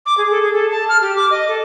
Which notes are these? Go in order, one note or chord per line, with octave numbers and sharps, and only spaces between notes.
D6
G#4
A4
G#4
A4
A5
F6
G4
D6
D#5
A4